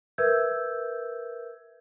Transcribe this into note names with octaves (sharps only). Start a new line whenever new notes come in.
A#4 B4 E5 E6 G6 G#6